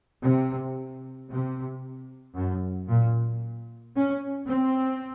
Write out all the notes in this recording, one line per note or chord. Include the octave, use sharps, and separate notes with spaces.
C3
C3
F#2
A#2
C#4
C4